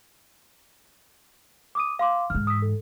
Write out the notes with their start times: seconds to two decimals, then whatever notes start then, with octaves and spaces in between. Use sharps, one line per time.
1.75 D6 D#6 D#7
1.99 F5 C6 D6
2.30 G#2 E3 F6
2.47 D#6 E6 B6
2.62 A4